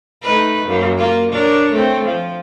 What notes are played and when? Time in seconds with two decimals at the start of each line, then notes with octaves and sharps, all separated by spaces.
0.22 A3 D#4 B4
0.66 F#2 A#3
0.97 A#3 F4
1.32 D4 A#4 C#5
1.72 A3 C4
2.05 F3